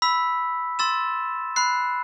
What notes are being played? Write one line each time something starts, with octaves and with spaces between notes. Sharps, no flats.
B5 E6 B6
C6 E6 A6 E7
B5 F#6 C7